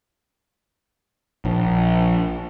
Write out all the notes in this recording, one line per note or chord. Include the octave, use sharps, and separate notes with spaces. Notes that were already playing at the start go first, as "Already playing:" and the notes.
A#1